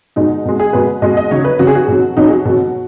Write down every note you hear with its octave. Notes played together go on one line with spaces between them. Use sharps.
B2 G#3 D#4
B2 G#3
G#4
B2 G#3 B4
B2 G#3 D#5
D#5
C#3 F#3 C#5
B4
C#3 F#3 F#4
G#4
F#4
B2 F#3
B2 F#3 D#4
G#4
F#4
B2 F#3